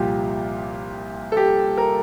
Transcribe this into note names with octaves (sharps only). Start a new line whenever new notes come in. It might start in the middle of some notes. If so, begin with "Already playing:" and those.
Already playing: C2 A#2 F3 G4
A4
G4
A#4